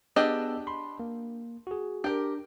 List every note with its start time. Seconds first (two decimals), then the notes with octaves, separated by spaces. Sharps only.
0.16 B3 D4 G4 G#4 D#5 E6
0.67 B5 C6
1.00 A#3
1.67 F#4 G#4
2.04 D4 G4 A#4